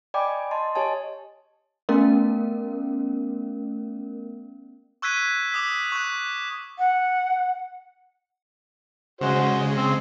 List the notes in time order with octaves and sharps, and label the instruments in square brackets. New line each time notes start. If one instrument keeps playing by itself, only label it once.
[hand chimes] D5 D#5 G5 G#5 B5 D6
D#5 A5 C6
G4 C#5 D#5 G#5 A5
[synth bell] A3 B3 C#4 A#4
[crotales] C#6 E6 F#6 G#6 B6 D#7
D6 D#6 B6
C#6 F#6
[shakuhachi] F#5
[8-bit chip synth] C#3 G#3 [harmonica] F#4 C5
[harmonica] C4